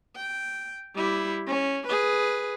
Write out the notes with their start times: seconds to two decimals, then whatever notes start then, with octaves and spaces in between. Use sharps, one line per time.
0.16 G5
0.95 G3 E4
1.48 C#4
1.87 G#4 B4